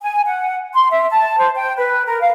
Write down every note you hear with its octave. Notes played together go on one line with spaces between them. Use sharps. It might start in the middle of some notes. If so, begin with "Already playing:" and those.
G#5
F#5
C6
E5
A5
C5
G5
B4
A#4
F5